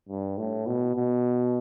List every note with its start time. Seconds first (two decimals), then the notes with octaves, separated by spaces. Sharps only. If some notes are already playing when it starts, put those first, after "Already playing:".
0.09 G2
0.37 A2
0.66 B2
0.95 B2